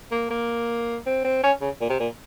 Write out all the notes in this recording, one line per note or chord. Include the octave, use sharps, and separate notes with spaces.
A#3
A#3
C4
C4
C#4
C#3
A#2
C3
A#2